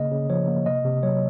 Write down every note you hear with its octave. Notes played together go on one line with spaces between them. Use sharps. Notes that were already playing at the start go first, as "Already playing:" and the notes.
Already playing: C#3 A#3 D#5
C#3
F3 C#5
A#3
C3 D#5
C3
F#3 C#5